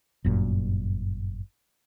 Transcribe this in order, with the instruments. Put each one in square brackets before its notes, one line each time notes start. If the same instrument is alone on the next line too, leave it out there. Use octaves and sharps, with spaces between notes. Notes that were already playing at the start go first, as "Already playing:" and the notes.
[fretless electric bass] G1 F#2 A#2